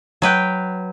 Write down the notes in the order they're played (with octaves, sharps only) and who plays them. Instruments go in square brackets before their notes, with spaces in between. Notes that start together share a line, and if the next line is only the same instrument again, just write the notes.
[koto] F#3 B4 G5